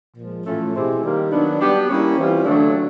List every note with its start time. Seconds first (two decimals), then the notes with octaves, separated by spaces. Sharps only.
0.16 A#2 F3 G#3
0.45 A2 E3 A3 C#4 F4
0.74 B2 G#3 C4 E4 G4
1.01 D#3 G3 A#3 D#4
1.31 D#3 F#3 B3 D4
1.60 G3 B3 D4 G4
1.87 G3 A#3 C#4 E4 G4
2.16 E3 G3 C4 F4
2.44 D3 F#3 A3 D4